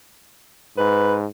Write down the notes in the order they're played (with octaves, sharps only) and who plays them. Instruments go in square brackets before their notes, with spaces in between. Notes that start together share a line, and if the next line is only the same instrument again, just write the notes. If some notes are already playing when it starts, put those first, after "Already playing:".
[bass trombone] G#2 [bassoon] B4